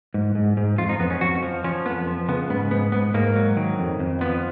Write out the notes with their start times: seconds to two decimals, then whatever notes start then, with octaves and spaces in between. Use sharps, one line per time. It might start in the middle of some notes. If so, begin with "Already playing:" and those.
0.14 G#2
0.35 G#2
0.57 G#2
0.78 F2 F4
0.89 D#4
1.00 F2 B3
1.10 C#4
1.21 F2 F#4
1.43 F3
1.64 F3 C#4
1.85 F2 B3
2.07 F3
2.29 C#3 B3
2.50 G#2 B3
2.71 G#2 B3
2.92 G#2 B3
3.14 G#2 A#3
3.35 F#3
3.57 D#3
3.79 F2
3.99 F2
4.21 F3 B3